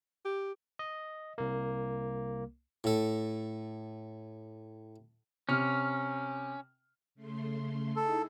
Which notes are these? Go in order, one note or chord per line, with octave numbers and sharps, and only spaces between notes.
G4
D#5
C2 A#3
A2 A4
C3 C#4 F6
C#3 A3 C6
D#4 E4 G#4 A4